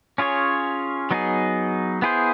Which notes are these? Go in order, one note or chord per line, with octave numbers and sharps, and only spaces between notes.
C#4 F4 G#4 C#5
F#3 B3 D#4 G#4
B3 E4 G#4 C5